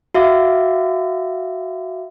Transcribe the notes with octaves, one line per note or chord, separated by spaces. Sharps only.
F#4 E5 F5 D6